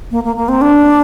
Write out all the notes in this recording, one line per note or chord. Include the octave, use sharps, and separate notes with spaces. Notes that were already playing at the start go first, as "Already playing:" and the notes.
A#3
A#3
A#3
C4
D4